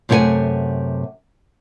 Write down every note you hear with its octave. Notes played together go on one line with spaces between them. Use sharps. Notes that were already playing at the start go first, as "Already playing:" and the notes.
F#2 C3 A3 E4 F#5 G#5